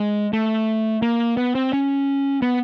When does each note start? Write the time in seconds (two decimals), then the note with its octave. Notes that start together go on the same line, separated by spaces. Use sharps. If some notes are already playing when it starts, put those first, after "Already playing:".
Already playing: G#3
0.33 A3
1.02 A#3
1.37 B3
1.55 C4
1.73 C#4
2.42 B3